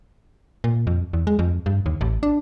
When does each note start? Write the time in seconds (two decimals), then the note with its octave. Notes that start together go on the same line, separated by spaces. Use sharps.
0.64 A#2
0.87 F2
1.13 E2
1.27 G#3
1.39 F2
1.66 G2
1.86 D#2
2.01 A1
2.23 D4